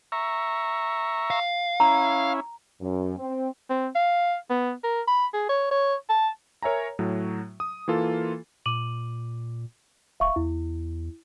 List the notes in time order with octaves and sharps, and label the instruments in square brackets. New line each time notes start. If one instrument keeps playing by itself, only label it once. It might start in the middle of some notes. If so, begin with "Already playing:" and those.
[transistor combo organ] E5 A#5 C#6
[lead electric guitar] F5
[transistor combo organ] C#4 E4 [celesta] A#5
[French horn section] F#2
C4
[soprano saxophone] C4
F5
B3
A#4
B5
G#4
C#5
C#5
A5
[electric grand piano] A#4 C#5 E5 G#5 A#5
A2 F#3
D#6
E3 A#3 F4 A4
[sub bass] A#2 [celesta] D6 D#7 F#7
[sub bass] D1 [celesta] E5 F5 C#6
[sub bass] E2 [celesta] E4